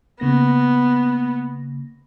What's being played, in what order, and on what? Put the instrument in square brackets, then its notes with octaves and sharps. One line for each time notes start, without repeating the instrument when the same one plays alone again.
[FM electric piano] C#3 A#3 A#6 [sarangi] B3